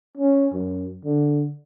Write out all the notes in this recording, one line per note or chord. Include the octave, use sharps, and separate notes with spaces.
C#4
F#2
D3